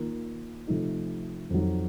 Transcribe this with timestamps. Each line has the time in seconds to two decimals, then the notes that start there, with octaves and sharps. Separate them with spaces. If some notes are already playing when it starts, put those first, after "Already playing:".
Already playing: D#3 A#3 F4 A#4
0.67 C3 F3 A3 D#4
1.50 F2 D#3 F#3